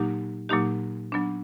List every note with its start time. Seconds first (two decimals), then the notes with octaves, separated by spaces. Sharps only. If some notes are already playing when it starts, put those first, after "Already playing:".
Already playing: A#2 F#3 A#3 D#4 G4
0.49 A#2 F#3 A#3 D#4 G4
1.12 F#3 B3 D4